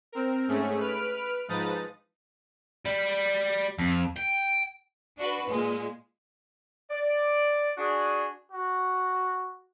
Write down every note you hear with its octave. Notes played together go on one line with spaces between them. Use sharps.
C4 A#4
G#2 A3 C#4 G#4
B4 F6 D7
G#2 F3 D#4 B4 D#6 A6
G3
F2
G5
D4 F#4 B4
A#2 G#3
D5
D4 F#4 G#4
F#4